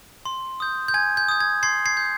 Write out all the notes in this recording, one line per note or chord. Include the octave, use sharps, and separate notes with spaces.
C6
D#6 G6
G6
G#5 G#6
G6
D#6 G6
G#6
C6 G#6 C7
G#6 C7
D#6 G6